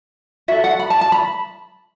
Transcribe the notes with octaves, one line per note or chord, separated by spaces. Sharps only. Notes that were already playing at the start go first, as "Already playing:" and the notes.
F#4 A4 E5
F#5
B5
A5
A5
B5